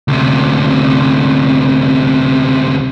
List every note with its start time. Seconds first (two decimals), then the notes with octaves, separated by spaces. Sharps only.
0.08 D2 C3